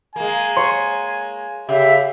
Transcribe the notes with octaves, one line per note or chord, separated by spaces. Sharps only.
G#3 A#3 G#5
C#5 C6
C#3 G4 E5